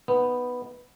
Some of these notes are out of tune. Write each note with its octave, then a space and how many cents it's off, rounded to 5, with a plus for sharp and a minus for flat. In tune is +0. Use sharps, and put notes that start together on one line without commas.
B3 +0 D#4 +0